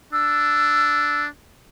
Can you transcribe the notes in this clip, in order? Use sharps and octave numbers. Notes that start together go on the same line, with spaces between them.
D4 E6